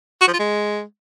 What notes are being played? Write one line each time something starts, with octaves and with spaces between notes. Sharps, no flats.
F#4
F3
F4
G#3